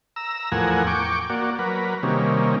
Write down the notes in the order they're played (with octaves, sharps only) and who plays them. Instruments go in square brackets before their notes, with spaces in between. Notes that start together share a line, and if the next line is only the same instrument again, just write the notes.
[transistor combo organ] A#5 E6
E2 A2 F3 A#4 F#5 G#5
G5 C#6 D6
A#3 F#4 D5
F#3 A#4 B4
C3 D#3 G3 A#3 C#4